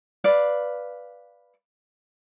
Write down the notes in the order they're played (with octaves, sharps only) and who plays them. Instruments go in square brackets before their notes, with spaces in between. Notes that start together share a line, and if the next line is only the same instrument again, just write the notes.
[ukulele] B4 D5 F5